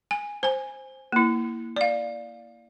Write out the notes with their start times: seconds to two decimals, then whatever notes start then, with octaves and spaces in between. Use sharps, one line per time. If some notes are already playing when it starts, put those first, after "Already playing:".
0.11 G#5
0.43 C5 G#5
1.12 A#3 E4
1.76 D5 F5